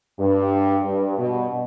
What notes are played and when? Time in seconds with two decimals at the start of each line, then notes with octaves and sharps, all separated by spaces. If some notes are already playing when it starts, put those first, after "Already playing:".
0.19 G2
0.85 G2
1.18 B2